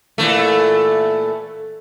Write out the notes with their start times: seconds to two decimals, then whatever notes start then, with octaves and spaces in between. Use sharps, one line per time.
0.18 A#2 E3 A3